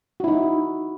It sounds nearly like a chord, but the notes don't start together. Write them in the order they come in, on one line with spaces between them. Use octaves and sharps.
F#4 E4 D#4